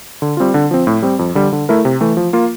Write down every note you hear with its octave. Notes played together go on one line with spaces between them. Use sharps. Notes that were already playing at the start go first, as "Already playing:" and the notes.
D3
G3 C4 F4
D3
F3 C4
A2
G3 C4
F2
D3 G3
D3
A3 E4 A#4
C3
E3 A3
F3
A#3 F4